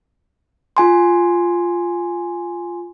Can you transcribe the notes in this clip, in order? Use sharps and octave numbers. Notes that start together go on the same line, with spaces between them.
F4 G#5 C6